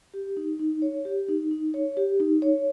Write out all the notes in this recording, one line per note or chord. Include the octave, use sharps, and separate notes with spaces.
G4
D#4
D#4
C#5
G4
D#4
D#4
C#5
G4
D#4
C#5